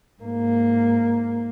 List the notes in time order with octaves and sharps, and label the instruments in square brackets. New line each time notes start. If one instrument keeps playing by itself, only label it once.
[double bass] G#2 A#3